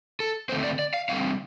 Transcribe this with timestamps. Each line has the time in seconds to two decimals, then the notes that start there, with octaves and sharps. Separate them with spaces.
0.20 A4
0.49 D3 A3 C4 C5
0.64 D5
0.79 D5
0.94 F5
1.09 D3 G3 C4 F5